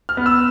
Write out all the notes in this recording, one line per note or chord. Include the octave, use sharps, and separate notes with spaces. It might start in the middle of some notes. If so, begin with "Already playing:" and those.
F6
B3
E6